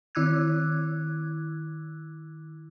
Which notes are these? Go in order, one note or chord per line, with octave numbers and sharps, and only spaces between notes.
D#3 E4 D6 E6 F#6 G#6